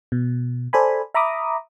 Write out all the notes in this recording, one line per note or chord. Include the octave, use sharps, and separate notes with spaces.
B2
A4 C5 D5 G#5 B5
E5 A#5 B5 D6 D#6